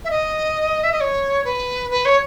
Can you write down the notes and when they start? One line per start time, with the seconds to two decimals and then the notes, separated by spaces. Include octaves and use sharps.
0.04 E5
0.10 D#5
0.83 E5
0.92 D#5
1.00 C#5
1.44 B4
1.90 B4
2.05 C#5